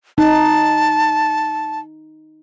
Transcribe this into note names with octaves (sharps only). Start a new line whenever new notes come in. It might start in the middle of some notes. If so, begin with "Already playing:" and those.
D#4 A5